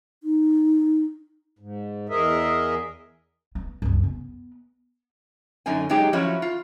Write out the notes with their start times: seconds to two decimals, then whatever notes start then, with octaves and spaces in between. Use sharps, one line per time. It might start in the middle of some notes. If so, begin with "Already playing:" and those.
0.23 D#4
1.59 G#2
2.09 E2 G#4 A#4 D#5 E5
3.55 B3
3.82 C#2 F#2
4.03 B3
5.66 F#2 D3 D#4 G#5
5.89 F#3 G#3 D#4 G4 G#4
6.13 F3 F#3 C#4 E4 F#4
6.42 F4